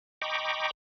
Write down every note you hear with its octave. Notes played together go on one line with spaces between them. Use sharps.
D#5 G5 A#5 B5 C#6 D6